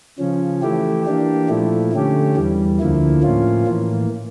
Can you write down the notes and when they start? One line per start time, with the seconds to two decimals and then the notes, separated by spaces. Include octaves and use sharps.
0.19 C#3 F3 C#4
0.62 E3 A3 E4 G4
1.06 E3 A#3 D4 G4
1.49 A#2 F3 A3 E4
1.93 D3 A3 C#4 G4
2.36 E2 E3 G3
2.79 D2 D3 F3 A#3 E4
3.23 A2 F3 A#3 C#4 F4
3.66 A2 E3 A#3